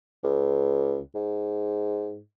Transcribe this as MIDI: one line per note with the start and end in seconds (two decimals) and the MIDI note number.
0.24 1.01 37
1.15 2.21 44